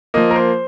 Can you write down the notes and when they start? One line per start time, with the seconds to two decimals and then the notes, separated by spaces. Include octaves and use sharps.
0.14 F3 A#3 D#5
0.31 A#4
0.36 C5